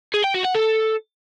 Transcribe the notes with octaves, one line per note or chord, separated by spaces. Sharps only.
G#4
G5
F#4
F#5
A4